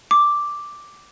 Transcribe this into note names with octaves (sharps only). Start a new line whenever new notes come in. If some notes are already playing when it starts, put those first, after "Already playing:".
D6